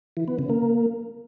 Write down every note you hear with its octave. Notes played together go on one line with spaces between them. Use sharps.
E3
B3
C#3
A#3